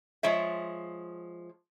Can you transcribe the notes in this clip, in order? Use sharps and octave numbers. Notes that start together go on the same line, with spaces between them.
F3 G#3 C#5 E5